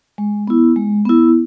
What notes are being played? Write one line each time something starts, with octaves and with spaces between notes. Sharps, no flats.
G#3
B3 E4
G#3
B3 E4